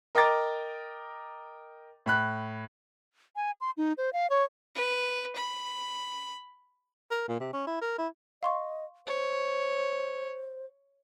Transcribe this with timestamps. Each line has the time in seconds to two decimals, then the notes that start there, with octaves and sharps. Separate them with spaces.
0.15 A#4 D#5 G5 A#5 D6 A6
2.06 A2 B5 F#6
3.36 G#5
3.61 C6
3.77 D#4
3.98 C5
4.13 F5
4.30 C#5
4.75 B4
5.36 B5
7.11 A#4
7.28 A#2
7.40 C3
7.53 C#4
7.67 E4
7.81 A#4
7.98 E4
8.43 D#5 F5 C6 C#6
9.07 C5 C#5